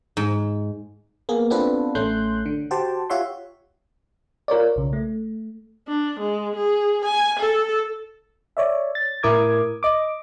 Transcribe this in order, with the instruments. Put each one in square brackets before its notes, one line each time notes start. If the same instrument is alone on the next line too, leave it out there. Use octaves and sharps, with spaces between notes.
[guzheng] G#2
[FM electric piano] A#3 B3 G#4
B3 C4 D4 F4 A4 B4
A1 A3 C#4 C6 F#6 G6
D3
F#4 G4 C5 G5 A5
F4 G4 C#5 E5 F#5 C6
F4 A#4 C#5 D5
B1 C#3
A3
[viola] D4
G#3
G#4
G#5
A4
[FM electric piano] C#5 D5 E5
A6
A2 E4 A#4 D6 D#6 G#6
D#5 D6